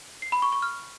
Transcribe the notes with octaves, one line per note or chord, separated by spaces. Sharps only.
C7
B5
C#6
C#6
F6